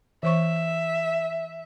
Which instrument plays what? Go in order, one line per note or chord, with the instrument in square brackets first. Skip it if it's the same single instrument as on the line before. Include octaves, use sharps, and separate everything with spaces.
[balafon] E3 C5 C#6 [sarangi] E5